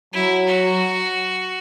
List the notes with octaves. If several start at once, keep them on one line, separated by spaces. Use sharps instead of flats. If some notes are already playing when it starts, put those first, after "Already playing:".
F#3 E4
F#4